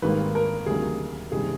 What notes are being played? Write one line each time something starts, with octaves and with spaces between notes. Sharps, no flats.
G#1 G#2 D#3 G3 A#3 B4
A#4
D2 C3 D#3 F#3 A#3 G#4
F#1 C3 D#3 G3 G#4